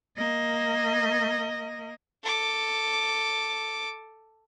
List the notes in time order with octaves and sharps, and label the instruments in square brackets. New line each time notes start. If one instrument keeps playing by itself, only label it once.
[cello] A#3 D#5
[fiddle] A4 D6